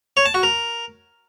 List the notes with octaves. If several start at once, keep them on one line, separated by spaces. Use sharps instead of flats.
C#5
A5
F#4
A#4